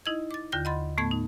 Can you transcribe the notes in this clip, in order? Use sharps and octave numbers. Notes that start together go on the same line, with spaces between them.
D#4 E4 D#5 G#6
D6 A6
D#2 D3 F4 G6 A#6
D#5 F#5 B5 C6 A6
A2 A3 B3 A5 G#6
D#4